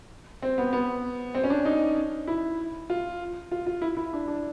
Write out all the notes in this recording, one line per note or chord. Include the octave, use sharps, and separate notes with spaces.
C4
B3
B3
C4
C#4
D4
D#4
E4
F4
F4
F4
E4
E4
D4
D4